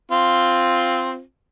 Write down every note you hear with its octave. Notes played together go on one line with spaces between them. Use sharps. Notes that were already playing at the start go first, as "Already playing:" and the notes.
C4 F4